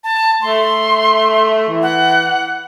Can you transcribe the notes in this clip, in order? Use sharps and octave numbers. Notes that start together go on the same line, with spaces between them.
A5
A3 C6
E3
F#5